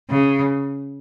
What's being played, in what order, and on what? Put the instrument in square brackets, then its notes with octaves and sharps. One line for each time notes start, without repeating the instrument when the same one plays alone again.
[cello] C#3